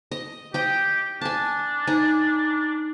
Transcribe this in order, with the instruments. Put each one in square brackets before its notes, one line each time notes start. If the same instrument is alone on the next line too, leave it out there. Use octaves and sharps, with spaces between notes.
[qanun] D#5
[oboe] G4 [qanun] D#5 G5
[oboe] D4 [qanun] G#5 A5
[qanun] D#4 G#5